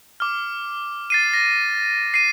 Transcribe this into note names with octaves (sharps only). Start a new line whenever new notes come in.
D6 F6
A6 C7 D#7
A#6
C7 D#7